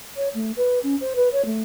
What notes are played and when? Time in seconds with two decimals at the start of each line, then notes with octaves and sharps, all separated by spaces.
0.16 C#5
0.34 A3
0.56 B4
0.83 C#4
1.00 C5
1.15 B4
1.31 C#5
1.45 A3